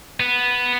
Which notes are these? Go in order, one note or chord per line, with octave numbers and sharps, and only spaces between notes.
B3